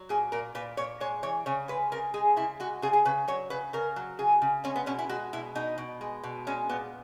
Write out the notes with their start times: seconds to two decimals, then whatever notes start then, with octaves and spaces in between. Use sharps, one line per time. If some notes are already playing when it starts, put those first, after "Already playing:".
Already playing: F#3
0.09 A#2 G#4
0.32 A#2 A#4
0.55 A#2 B4
0.77 A#2 C#5
1.00 G#3 C#5
1.23 E3 C#5
1.46 C#3 C#5
1.68 G#3 B4
1.92 C#3 A#4
2.14 G#3 G#4
2.36 C#3 E4
2.60 G#3 F#4
2.82 C#3 G#4
2.93 G#4
3.05 C#3 B4
3.28 F#3 C#5
3.50 C#3 B4
3.73 C#3 A#4
3.96 F#3
4.19 C#3 G#4
4.42 C#3
4.64 G#3 C#4
4.76 B3
4.86 B2 C#4
4.99 E4
5.09 G#3 F#4
5.33 B2 E4
5.55 B2 D#4
5.78 B2
6.01 G#3
6.23 B2
6.47 G#3 C#4
6.69 A#2 B3